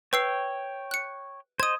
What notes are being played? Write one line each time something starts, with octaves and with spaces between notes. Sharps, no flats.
B4 C#5 G5 E6 C7
F#6 C#7
C5 D#5 D#6 G#6